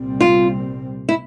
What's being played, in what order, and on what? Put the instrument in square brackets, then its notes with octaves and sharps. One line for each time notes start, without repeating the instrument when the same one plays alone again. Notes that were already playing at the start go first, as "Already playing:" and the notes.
Already playing: [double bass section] C2 A#2 G3 C4
[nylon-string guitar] F4
E4